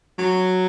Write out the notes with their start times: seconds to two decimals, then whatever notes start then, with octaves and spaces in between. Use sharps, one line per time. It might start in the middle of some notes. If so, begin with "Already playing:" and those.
0.19 F#3